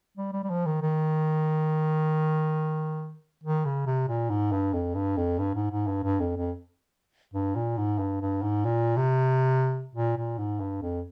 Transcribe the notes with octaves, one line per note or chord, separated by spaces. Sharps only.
G3
G3
G3
F3
D#3
D#3
D#3
C#3
C3
A#2
G#2
G2
F2
G2
F2
G2
G#2
G#2
G2
G2
F2
F2
G2
A#2
G#2
G2
G2
G#2
A#2
C3
A#2
A#2
G#2
G2
F2